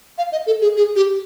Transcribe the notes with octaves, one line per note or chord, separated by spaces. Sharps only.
F5
D#5
A4
G#4
G#4
G4